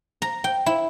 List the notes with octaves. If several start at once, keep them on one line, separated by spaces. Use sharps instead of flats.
A#5
G5
E4